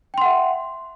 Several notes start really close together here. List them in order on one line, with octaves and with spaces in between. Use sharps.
G5 C6 F#5 E5